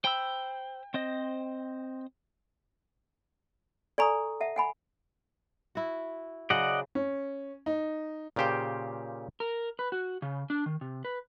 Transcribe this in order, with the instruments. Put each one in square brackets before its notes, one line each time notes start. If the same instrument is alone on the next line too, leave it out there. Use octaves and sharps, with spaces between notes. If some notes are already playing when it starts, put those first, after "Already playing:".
[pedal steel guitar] C5 B5 E6 [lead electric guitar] G5
[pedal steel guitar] C4 C5 D#5
[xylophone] A4 A#5 D#6 [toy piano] D5 G#5 C#6
[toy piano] E5 F#5 A5
F#5 G#5 B5
[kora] E4 F#4
[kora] C#3 F#3 C5 [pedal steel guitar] D5 D#5 F#5
[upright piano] C#4
D#4
[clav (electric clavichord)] A#2 C#3 F4 G4 C5 G5
[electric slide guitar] A#4
B4
F#4
C#3
D4
D#3
C3
B4